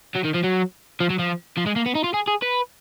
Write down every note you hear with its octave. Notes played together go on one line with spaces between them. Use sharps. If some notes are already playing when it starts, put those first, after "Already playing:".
F#3
D#3
F3
F#3
F3
F#3
F3
F3
G#3
A#3
B3
D#4
F4
G#4
G#4
B4